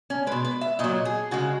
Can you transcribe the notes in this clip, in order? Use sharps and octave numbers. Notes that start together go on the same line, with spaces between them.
C#4
B2 G#3 B4
B4
E5
A#2 F#3 D#5
G#4
C#3 G#3 F#4